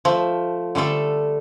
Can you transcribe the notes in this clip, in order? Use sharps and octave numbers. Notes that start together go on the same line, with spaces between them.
F3 A3
D3 G3 A3 A4